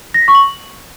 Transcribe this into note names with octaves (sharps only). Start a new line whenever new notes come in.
A#6
B6
C#6
F#7